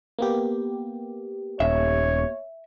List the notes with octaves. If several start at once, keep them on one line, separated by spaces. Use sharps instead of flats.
A#3 B3 G4
D#1 C#5 E5